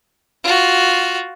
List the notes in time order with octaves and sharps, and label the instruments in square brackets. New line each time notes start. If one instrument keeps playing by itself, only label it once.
[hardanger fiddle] F4 F#4